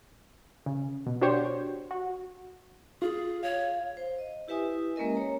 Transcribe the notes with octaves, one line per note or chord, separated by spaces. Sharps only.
C#3
B2
D4 F#4 G4 C5 C#5
F#4
F4 G#4
C#5 F5
C5
D#5
E4 G4 B4 E5 G#5 D#6
G#3 A#3 C#4 A#4 D#5
C#5 A#5